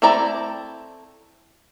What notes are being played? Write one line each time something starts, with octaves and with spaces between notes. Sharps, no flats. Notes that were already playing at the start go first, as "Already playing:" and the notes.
A3 C4 E4 D5 A#5